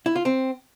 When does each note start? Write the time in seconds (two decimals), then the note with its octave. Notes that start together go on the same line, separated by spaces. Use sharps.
0.06 E4
0.16 F4
0.25 C4